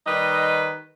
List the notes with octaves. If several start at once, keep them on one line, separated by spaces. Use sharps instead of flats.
D#3 G3 B4 D#5